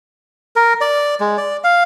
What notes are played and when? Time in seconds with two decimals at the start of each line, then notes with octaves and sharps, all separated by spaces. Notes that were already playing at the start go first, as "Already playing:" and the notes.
0.56 A#4
0.81 D5
1.20 G#3
1.38 D5
1.64 F5